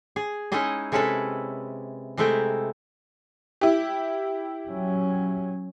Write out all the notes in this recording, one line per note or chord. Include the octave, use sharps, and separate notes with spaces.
G#4
G#3 C#4 D#4 E4 G#4 D#5
C3 G#3 C#4 E4 A4 B4
C3 G#3 A3 E4 G5 A#5
E4 G4
F#3 C#4